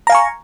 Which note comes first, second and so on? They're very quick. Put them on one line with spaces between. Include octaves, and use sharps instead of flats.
A#5 F5 G#5 C#6